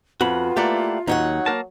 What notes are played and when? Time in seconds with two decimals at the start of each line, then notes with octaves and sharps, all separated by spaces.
0.21 F2 B3 F4 F#4 B5
0.57 A3 A#3 E4 G4 D5 F#5
1.07 D#2 F#3 D#4 C#5 F#5
1.46 A#3 A#4 A5